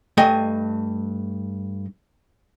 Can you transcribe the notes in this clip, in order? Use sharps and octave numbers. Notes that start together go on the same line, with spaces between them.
G2 A3 D#5 G5 G#5